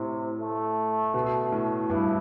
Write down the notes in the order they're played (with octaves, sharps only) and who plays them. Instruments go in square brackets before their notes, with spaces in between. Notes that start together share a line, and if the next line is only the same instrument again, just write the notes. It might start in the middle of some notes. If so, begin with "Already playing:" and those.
Already playing: [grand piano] A2 [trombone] C3
[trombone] A3
[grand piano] B2
A2
[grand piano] G2 [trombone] E4